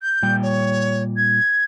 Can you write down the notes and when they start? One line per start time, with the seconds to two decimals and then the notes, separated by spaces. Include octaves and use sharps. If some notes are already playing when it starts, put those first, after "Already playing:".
0.01 G6
0.23 A#2 G3 G5
0.42 C#5
1.16 G#6